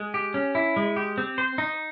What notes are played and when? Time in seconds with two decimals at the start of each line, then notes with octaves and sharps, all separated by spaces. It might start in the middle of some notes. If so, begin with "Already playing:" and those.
Already playing: G#3
0.14 G4
0.34 C#4
0.55 E4
0.77 G#3
0.96 G4
1.18 C4
1.38 C5
1.58 D#4